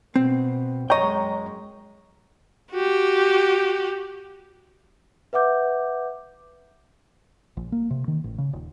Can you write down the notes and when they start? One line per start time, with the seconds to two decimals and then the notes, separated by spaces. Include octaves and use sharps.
0.16 B2 C4
0.90 F#2 G#3 C#5 D#5 G5 A#5 C#6
2.71 F#4 G4
5.33 B4 E5 F#5 D6 G6
7.57 A#1
7.72 A#3
7.90 C3
8.08 D#3
8.24 A1
8.38 C#3
8.53 D#1